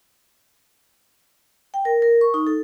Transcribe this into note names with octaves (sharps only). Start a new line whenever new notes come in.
G5
A#4
A#4
C#6
D#4
A4